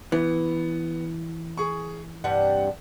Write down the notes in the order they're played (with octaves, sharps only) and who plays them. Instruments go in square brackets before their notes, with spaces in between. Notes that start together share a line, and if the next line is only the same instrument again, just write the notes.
[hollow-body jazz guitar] E3 [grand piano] B3
[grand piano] G#4 C#6
[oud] G2 C3 G3 [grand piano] F#5